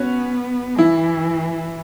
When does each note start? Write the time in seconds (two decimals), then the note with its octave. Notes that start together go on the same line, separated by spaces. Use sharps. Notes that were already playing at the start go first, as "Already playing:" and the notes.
Already playing: B3 C#4 F#4
0.78 E3 E4